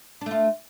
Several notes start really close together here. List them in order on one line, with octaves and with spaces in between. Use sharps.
D4 A3 F4